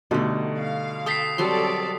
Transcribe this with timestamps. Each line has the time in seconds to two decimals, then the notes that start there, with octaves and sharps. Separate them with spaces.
0.11 B2 D3 G3 A3 D#4
0.61 F5
1.06 A4 G5 A5 D#6 B6 C7
1.38 F#3 G3 C4 A4 D5 C6